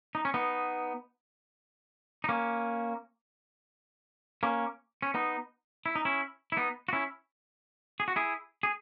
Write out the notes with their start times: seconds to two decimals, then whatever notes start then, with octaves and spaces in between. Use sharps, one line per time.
0.15 D#4
0.25 C#4
0.34 B3 D#4
2.24 D#4
2.29 A#3 C#4
4.43 A#3 C#4
5.02 C#4
5.14 B3 D#4
5.86 E4
5.96 D#4
6.05 C#4 E4
6.52 E4
6.57 B3 D#4
6.89 F#4
6.93 C#4 E4
8.00 G#4
8.08 F#4
8.16 E4 G#4
8.63 G#4